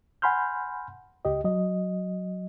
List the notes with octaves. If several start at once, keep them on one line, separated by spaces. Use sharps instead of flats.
F#5 G#5 B5 C6 F6 G6
C#2 G4 D#5
F#3 D#5